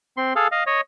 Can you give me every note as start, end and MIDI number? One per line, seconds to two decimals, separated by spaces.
0.17 0.33 60
0.17 0.33 84
0.36 0.48 68
0.36 0.48 69
0.36 0.48 77
0.52 0.64 75
0.52 0.64 77
0.66 0.81 73
0.66 0.81 75